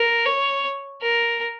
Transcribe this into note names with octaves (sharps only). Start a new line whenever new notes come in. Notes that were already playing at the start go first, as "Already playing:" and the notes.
Already playing: A#4
C#5
A#4